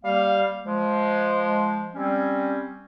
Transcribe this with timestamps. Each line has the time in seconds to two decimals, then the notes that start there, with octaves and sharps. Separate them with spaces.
0.04 G3 A#3 F5
0.64 F3 G#3
1.95 G3 C4 C#4